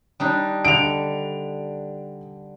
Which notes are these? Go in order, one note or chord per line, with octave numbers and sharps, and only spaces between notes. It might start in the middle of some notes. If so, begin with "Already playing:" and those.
G3 D4 D#4
D3 D7 F7